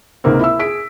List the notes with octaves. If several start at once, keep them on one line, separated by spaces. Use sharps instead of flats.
C#2 G#2 A#3 C4
E4 E5 E6
G#4 B6 D7